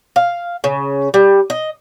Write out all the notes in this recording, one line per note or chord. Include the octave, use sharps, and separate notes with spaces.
F5
C#3
G3
D#5